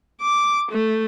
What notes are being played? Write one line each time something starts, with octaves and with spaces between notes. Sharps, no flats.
D6
A3